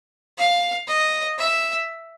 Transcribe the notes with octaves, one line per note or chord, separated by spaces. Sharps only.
F5
D#5
E5